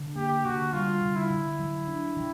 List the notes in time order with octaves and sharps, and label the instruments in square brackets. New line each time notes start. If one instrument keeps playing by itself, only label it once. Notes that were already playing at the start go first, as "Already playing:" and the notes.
Already playing: [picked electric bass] D3
[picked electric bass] A#3 [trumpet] G4
[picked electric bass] D3 [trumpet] F#4
[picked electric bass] G3 [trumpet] F4
[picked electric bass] D3
[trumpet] E4
[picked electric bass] D3
F#3
D4
D#3